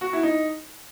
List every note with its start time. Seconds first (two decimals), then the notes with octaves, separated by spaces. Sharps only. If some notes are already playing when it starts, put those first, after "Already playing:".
0.01 F#4
0.13 E4
0.23 D#4